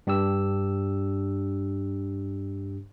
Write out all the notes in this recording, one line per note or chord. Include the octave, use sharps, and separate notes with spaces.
G2 D4 G4 E6